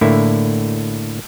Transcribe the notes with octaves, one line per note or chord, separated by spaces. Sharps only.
A2 D3 A#3 E4